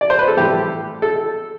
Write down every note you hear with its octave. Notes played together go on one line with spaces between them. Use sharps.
D5
C5
B4
A4
A2 E3 G3 G4
A4